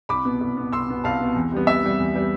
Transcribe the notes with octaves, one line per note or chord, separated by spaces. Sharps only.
C2 B5 D6
B2 B3
C2
B2 B3
C2 C6 E6
B2 B3
C2 F5 A5
B2 B3
E2
C3 G3 B3
E2 E5
C3 G3 B3
E2
C3 G3 B3